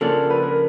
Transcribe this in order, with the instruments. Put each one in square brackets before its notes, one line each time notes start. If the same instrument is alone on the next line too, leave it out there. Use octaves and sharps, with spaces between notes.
[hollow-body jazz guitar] C#3 F3 A#3 D4 [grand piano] A4
[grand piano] B4
A#4